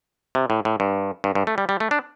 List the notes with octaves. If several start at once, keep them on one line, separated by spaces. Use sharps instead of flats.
C3
A2
A2
G2
G2
G2
A3
G3
G3
A3
D4